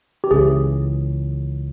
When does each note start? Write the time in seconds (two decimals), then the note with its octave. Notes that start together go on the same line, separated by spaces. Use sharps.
0.24 G4
0.31 C#2 C#3 E3 G#4